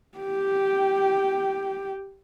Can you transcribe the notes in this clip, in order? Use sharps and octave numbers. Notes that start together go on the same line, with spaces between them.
G4 G5